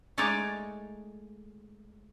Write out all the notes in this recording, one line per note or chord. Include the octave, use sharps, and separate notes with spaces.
G#3 A3 D#4 C#5 D5